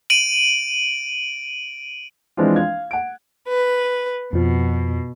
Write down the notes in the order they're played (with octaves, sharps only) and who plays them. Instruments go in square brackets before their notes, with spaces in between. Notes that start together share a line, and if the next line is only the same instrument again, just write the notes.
[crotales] D7 D#7 F#7
[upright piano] E3 F3 G#3 C4 D4 F4
F5 G#6
F#5 D7
[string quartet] B4
[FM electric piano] F2 F3 [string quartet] B2